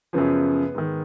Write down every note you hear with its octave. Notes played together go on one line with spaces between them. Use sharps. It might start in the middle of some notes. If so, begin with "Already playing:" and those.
F#2 C#3 F3 B3
G#2 D#3